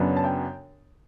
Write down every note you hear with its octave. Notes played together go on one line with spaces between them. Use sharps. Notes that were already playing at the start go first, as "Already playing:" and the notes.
Already playing: F#2 C#3 F#3 B3 D4
A5
G5